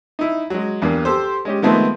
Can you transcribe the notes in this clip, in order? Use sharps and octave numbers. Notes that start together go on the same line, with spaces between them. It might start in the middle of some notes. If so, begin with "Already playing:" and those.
D#4 E4
F#3 G#3
E2 G2 A#3
G4 A4 C5
G#3 C#4 G4
D#3 F3 G#3 A3 B3 C4